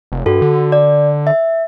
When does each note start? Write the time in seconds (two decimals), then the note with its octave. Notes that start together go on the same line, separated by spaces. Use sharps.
0.12 F1
0.26 G2 F#4 A4
0.42 D3
0.72 D5
1.27 E5